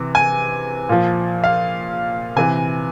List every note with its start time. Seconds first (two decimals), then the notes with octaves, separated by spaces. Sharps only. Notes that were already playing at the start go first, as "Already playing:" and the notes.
Already playing: C3 E3
0.15 G#5
0.89 A#2 F3
1.44 F5
2.36 C3 E3 G#5